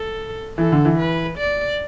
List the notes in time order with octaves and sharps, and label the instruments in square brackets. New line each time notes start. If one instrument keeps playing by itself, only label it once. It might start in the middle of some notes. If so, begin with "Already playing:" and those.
Already playing: [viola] A4
[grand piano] E3 [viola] A4
[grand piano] D3
E3
[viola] B4
D5